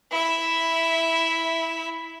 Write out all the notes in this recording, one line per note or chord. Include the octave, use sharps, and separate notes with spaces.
E4 E5